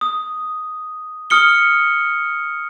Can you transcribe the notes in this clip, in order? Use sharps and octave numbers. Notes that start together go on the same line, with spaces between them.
D#6
D#6 F6 C#7 G7